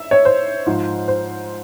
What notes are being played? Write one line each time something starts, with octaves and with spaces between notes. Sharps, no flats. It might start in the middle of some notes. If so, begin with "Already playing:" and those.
Already playing: E5
C#5
C5
G#2 F3
C5